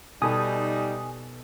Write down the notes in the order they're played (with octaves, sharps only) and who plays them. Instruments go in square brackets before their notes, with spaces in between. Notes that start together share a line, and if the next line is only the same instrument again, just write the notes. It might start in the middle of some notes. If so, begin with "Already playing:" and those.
[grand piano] B2 A4 [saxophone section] G3 D#4 [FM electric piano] G#5 D#6